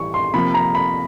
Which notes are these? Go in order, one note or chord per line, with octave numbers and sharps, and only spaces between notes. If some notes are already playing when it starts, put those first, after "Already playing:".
Already playing: A2 E3 G3 C#6
C6
C3 F3 A#3 B5
A#5
B5